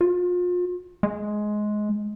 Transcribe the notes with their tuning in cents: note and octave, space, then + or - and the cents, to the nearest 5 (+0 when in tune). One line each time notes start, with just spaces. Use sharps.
F4 +35
G#3 +15